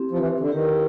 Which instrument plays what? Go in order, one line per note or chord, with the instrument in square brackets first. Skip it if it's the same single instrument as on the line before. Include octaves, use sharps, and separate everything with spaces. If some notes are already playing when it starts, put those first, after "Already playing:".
Already playing: [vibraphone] C4 E4 G4
[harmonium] F3
E3
D3
[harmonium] D#3 [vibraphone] E4 G4 B4